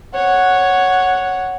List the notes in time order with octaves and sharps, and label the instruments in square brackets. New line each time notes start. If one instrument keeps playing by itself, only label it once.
[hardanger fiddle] C#5 F#5